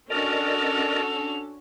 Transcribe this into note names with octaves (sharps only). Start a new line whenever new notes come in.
C#4 D4 F#4 A4 A#4 D5 D#5 F7